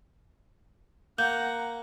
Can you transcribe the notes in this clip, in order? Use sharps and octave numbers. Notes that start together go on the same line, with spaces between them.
A#3 F#5 A#5 G6